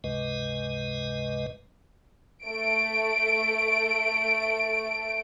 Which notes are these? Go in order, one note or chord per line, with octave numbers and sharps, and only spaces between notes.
C#2 G2 C3 G#3 B4 D#5
A3 D7